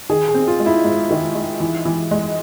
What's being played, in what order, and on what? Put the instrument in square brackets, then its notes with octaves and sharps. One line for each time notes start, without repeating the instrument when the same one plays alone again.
[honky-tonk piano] D#3 [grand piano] G#4
[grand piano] G#4
[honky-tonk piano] C4
[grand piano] F4
[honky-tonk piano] G#3
[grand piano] E4
[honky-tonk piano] G#2
D#3
G#3
E3
E3
G#3